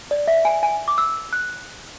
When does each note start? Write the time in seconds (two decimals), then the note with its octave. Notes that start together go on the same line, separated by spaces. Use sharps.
0.11 D5
0.28 E5
0.45 G#5
0.63 G#5
0.88 D6
0.98 E6
1.33 F#6